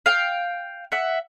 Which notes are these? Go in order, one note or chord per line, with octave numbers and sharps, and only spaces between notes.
F5 G5
E5 F#5